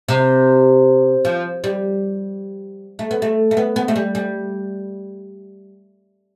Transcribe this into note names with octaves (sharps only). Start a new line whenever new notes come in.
C3
F3
G3
A3
B3
A3
A3
B3
B3
A3
G3
G3